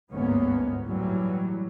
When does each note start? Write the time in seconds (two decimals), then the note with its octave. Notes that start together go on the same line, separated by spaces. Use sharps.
0.12 G1 D2 G#2 A#3 B3 C#4
0.87 A2 E3 F#3 G3